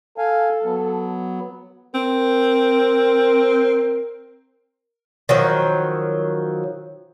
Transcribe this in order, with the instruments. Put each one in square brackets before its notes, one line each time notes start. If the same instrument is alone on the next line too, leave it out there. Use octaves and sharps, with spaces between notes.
[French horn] A4 [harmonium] F5 G#5
[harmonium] F#3 B3
[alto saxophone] C4 [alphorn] A#4
[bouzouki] D#3 F3 F#3